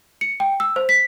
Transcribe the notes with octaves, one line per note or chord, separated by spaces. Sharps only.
C#7
G5
E6
C5
B6